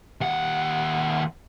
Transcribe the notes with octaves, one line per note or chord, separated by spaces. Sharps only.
D#2 F#5